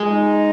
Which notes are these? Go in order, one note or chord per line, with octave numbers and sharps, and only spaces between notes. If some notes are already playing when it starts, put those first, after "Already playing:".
Already playing: G#3
D#4